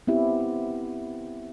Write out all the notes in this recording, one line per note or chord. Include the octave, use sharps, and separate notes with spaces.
B3 C4 E4 G4